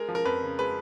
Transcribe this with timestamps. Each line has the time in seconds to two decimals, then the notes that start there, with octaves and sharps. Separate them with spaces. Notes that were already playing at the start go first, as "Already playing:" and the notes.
Already playing: G#3 A#4
0.08 F3
0.15 A#4
0.25 F2 B4
0.42 C#3
0.58 G#3 B4